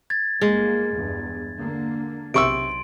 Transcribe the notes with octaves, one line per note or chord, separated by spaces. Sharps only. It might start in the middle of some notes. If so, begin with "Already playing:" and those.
G#6 A6
G1 G#3 A#3
E2 G2
D3 A#3
B1 C3 C6 C#6 E6 D7